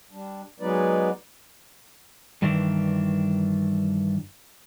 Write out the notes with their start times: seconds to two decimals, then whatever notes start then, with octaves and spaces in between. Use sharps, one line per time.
0.11 G3 D4
0.60 F#3 G#3 B3 D#4 B4 D5
2.42 G2 D#3 E3 D4